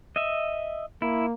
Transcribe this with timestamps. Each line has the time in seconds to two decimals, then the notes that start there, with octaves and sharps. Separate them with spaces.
0.16 D#5 E5
1.02 A#3 E4